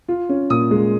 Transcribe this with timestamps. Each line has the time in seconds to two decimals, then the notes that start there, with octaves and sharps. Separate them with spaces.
0.08 F4
0.29 C#4
0.50 A#2 D#6
0.71 G#3